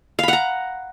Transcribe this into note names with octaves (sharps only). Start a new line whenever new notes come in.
F5 F#5 A#5 B5